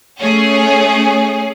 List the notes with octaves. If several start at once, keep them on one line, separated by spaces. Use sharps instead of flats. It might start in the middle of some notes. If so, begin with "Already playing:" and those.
A3 C#4 G#4